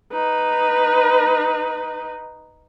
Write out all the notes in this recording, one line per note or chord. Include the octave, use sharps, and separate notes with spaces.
D#4 B4